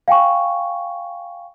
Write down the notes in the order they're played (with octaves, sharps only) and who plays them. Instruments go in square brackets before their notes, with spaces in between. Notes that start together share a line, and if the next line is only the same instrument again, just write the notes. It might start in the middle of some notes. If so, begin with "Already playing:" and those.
[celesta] F5 G5 G#5 C#6